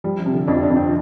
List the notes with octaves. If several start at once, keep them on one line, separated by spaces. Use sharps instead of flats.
F3 G3
F3
C3
D3
F2 D4
F4
D4
F2
C4
F3